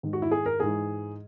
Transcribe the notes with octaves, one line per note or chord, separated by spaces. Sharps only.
G#2 D#3
F#4
E4
G#4
A#4
G#2 E3 G#4